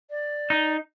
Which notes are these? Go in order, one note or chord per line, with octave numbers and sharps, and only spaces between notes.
D5
D#4